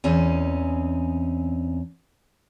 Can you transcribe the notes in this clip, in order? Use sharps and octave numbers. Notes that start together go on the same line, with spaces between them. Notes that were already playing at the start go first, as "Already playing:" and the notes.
E2 C4 C#4 D#4